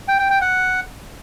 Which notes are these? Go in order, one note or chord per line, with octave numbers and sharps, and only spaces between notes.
G5
G5
G5
F#5